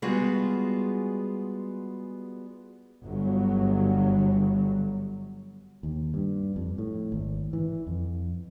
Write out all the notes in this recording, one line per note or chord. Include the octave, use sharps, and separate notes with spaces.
G3 G#3 B3 F4 F#4 G#4
G1 F#3
D#2
G2
F2
A2
G#1
E3
F2